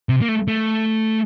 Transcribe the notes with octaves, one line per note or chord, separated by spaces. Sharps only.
C3
A#3
A3
A3